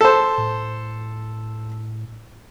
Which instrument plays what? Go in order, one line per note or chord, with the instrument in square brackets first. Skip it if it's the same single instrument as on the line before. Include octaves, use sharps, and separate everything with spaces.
[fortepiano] A4 C5
[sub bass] A2